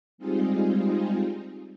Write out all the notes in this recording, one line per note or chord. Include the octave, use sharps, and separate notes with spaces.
G3 G#3 C4 D#4 F4 G#4